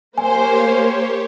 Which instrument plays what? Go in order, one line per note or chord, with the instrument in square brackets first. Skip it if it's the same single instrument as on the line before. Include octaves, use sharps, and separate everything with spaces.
[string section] A#3 C5 [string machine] G4 C#5 [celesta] G#5